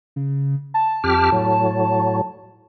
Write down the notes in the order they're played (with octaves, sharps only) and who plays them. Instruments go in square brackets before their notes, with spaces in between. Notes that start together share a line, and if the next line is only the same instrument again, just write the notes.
[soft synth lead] C#3
A5
[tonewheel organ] F2 G4 F6
A2 F#3